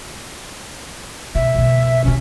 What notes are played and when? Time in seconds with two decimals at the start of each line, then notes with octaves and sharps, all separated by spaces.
1.35 B2 E5
1.55 C#2 B2
2.04 D#1 C#3 C#4